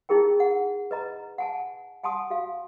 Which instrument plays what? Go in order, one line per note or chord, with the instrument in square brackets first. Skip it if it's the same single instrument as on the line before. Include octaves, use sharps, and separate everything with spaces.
[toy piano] D#4 E4 G#4 A#4 G5
F#5
B4 D#5 A#5
F#5 G#5 A5
F#5 G#5 A5 C6 D#6
F#4 F5